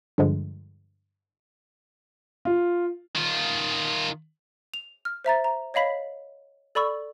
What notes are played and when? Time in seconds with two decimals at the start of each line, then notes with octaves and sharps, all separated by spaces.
0.18 G2 D3 F3 G#3
2.45 F4
3.15 D#3 F4
4.74 F7
5.05 F6
5.25 C5 E5 A#5 A6
5.44 A#5
5.74 C#5 D#5 F5 B5 B6
6.75 A4 D5 B5 C#6 E6